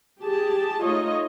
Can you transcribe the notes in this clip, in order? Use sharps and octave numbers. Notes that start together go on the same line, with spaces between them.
G4 G#4 A5
A3 D#4 F4 C#5 D#5